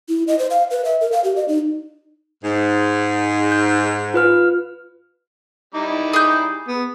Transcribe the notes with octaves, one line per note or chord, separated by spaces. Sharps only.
E4
D#5
C5
F5
B4
E5
A#4
F5
G4
D#5
D#4
G#2
G6
F4 B4 F6
G3 D#4 E4 D6
G#4 G6
B3